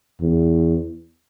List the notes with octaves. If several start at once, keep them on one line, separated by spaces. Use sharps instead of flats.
E2